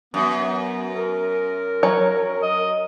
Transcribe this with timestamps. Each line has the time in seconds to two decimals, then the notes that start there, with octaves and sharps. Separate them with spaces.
0.14 F#2 B3
0.95 A#4
1.83 F#3 C#5 A#5
2.43 D#5